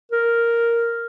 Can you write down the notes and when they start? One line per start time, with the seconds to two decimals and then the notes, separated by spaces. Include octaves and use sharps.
0.12 A#4